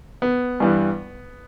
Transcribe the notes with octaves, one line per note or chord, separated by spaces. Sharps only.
B3
G2 E3 G3